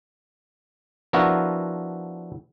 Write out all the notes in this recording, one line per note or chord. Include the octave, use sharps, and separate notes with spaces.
F3 B3 D4 E4 F#4 A#4